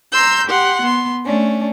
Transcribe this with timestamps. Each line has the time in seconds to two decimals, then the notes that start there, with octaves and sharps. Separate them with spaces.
0.11 A#5 C6 E6 G6
0.47 G4 F#5 C6
0.82 B3 C6
1.25 A3 C#4 D4